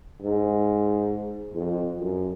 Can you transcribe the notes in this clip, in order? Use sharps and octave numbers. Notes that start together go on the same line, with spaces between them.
G#2
F2
F#2